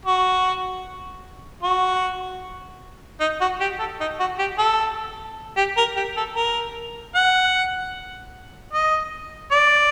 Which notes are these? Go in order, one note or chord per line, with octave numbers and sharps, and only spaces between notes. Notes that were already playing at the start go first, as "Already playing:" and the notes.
F#4
F#4
D#4
F#4
G4
A4
D#4
F#4
G4
A4
G4
A#4
G4
A4
A#4
F#5
D#5
D5